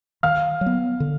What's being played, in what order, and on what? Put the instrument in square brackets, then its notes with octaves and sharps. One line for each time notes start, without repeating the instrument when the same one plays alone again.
[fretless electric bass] D#3 [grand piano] F5 F6
[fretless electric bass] F#3
B3
D3